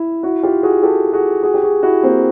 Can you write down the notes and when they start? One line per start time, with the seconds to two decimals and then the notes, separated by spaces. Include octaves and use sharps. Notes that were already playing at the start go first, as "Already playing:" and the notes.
Already playing: E4
0.23 E4 F#4
0.43 F4 G4
0.63 F#4 G#4
0.83 G4 A4
1.13 F#4 G#4
1.43 F#4 G#4
1.54 G4
1.63 F#4 G#4
1.83 E4 F#4
2.03 A#3 C4